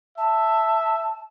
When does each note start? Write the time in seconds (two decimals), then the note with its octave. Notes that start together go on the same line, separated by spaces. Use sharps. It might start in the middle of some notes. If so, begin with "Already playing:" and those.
0.18 E5 A5